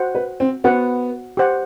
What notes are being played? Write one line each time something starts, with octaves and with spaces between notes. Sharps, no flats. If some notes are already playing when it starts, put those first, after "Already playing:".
Already playing: F#4 C5 F#5
B4
C4
B3 F#4 C5 F#5
G4 C5 F#5